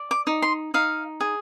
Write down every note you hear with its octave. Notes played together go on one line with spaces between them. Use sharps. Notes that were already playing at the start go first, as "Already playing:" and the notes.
Already playing: D5
D6
D#4
C6
D#4 F5
G#4